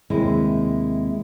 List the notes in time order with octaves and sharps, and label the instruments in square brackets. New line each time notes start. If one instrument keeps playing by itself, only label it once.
[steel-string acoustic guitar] D#2 C3 G#3 E4